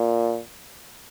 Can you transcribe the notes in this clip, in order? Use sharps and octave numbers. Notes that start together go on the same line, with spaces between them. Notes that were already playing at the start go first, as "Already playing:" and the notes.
Already playing: A#2